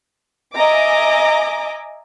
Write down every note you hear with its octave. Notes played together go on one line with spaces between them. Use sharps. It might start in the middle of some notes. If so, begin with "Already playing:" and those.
D#5 E5 G#5 A#5 D6